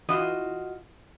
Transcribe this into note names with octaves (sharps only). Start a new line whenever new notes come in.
E3 F4 F#4 D#5